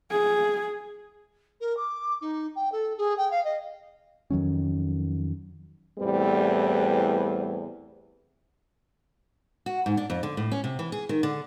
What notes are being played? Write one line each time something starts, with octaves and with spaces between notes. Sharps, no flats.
G#4
A#4
D6
D#4
G5
A4
G#4
G5
F5
D#5
F2 D#3 F#3 C#4
E2 A2 G3 C4 B4
F#4
G#2
D4
F2
D3
A2
C#4
C3
E3
G#4
D#3
D3